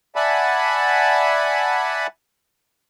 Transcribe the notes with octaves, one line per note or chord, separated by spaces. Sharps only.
D5 E5 F#5 G#5 A5 B5